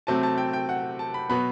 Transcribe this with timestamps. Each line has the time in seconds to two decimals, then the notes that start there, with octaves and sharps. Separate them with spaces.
0.07 C3 F#3 A3 C4 A5
0.23 A5
0.38 G5
0.53 G5
0.69 F#5
0.99 A5
1.14 B5
1.30 B2 F#3 B3 B5